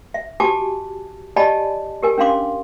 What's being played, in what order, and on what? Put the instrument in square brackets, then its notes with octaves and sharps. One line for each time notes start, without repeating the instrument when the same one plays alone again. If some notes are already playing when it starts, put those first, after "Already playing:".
[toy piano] E5
F#4 G4 G#5 A5 D6
G4 D5 D#5 G#5 A5 B5
G4 A#4 G#5
C#4 D4 F5 C6 D6